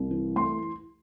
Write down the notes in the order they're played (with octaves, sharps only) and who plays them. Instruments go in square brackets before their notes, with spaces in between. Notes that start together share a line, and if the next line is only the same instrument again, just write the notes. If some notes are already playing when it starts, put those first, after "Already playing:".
Already playing: [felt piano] C2
E3
A3 C6